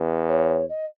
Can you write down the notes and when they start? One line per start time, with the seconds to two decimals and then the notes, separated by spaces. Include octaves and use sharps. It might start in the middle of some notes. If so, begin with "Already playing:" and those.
Already playing: E2
0.28 C#5
0.69 D#5